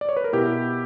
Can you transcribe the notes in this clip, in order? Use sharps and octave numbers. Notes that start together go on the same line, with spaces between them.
D5
C#5
B4
A#4
B2 E4 G4